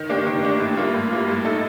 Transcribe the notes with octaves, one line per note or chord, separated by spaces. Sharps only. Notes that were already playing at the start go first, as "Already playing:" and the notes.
Already playing: D#3
A#3 D4 G4
D#3
A#3 D4 G4
A2
G3 A#3 F4
A2
G3 A#3 F4
A2
A3 D#4 A4